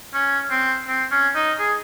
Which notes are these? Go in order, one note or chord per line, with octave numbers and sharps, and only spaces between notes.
C#4
C4
C4
C#4
D#4
G#4